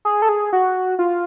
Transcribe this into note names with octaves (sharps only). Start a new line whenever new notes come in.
G#4
A4
G#4
F#4
F4